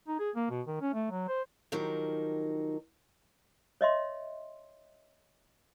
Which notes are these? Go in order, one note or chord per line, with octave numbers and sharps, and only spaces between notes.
D#4
G#4
A#3
B2
D#3
C#4
A3
F#3
C5
D#3 F3 F#3 D#4 G4 A#4
C#5 D#5 E5 C6